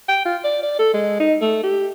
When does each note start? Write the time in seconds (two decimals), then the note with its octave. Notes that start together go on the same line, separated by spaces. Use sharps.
0.09 G5
0.25 F4
0.44 D5
0.63 D5
0.79 A4
0.94 G#3
1.20 D#4
1.41 A3
1.63 G4